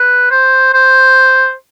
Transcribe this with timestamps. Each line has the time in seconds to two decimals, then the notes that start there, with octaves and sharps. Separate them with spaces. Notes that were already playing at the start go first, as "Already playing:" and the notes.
Already playing: B4
0.31 C5
0.74 C5